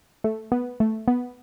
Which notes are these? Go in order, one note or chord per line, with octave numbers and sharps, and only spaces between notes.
A3
B3
A3
B3